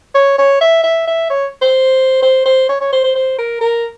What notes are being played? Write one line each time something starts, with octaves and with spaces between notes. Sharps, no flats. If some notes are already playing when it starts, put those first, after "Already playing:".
C#5
C#5
E5
E5
E5
C#5
C5
C5
C5
C#5
C#5
C5
C5
C5
A#4
A#4